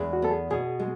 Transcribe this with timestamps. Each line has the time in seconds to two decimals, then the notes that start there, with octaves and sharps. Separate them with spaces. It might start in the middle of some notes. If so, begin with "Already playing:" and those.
Already playing: E2 G#3
0.13 F#4
0.22 B3 A4
0.31 G#4
0.51 B2 G#4
0.79 G#3